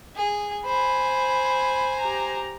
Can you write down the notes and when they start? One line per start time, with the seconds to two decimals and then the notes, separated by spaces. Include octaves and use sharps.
0.16 G#4
0.66 C5 G#5 B5
2.00 G4 A#5